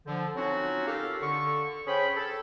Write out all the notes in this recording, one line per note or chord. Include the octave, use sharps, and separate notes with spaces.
D3 F3
F#3 C4 C#4 D#4 F4 F#4
F4 G4 A4 A#4 F5
D3 C#6
C#4 G#4 C5 G5 B5
A4